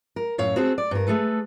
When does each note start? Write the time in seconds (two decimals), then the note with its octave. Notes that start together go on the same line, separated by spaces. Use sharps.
0.16 A#4
0.38 F#2 A2 C#5 F5
0.56 C4 F#4 G#4 A4
0.78 D5
0.91 G2 A#4
1.07 A3 G#4 A4 B4